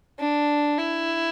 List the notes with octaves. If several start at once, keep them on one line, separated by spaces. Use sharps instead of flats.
D4
E4